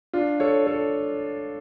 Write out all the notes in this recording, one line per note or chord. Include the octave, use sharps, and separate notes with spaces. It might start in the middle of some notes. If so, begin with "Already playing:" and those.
D4 F4
A4 C#5
A4 C#5